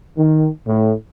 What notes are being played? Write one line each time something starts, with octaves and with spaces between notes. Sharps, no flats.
D#3
A2